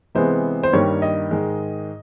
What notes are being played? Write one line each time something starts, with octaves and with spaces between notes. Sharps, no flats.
C3 E3 G#3 B3 C5
C5
G2 D#3 G3 A#3 C#5
D#5
G#2 D#3 G#3